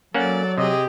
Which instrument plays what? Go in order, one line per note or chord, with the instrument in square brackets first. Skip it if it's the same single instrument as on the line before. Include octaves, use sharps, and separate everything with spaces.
[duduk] F#3 [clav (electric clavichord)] A#3 C#4 F#5 [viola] A4 D5
[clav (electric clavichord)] C3 [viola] G4 G#4 [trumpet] D#5